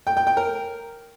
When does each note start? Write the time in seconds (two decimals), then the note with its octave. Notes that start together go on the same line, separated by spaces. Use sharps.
0.07 G5
0.17 G5
0.27 G5
0.37 A#4